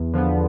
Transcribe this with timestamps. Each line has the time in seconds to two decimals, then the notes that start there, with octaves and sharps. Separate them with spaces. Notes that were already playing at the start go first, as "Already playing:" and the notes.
Already playing: E2
0.13 D3 F3 B3